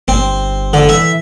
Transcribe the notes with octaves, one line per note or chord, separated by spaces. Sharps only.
G1 C4
D3
E3 E5